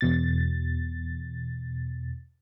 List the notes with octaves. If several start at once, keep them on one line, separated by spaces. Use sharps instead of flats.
E2 B2 A6